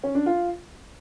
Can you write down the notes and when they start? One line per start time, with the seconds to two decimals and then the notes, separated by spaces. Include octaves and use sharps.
0.04 C#4
0.15 D4
0.26 F4